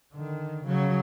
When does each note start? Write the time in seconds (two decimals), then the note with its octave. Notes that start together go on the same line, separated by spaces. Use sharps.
0.14 D3 D#3
0.64 C#3 F#3